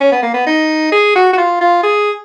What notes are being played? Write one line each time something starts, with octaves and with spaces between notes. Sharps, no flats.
C#4
B3
A#3
B3
D#4
G#4
F#4
F#4
F4
F4
G#4